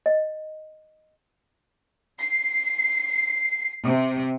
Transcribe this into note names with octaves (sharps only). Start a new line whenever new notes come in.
D#5
C7
C3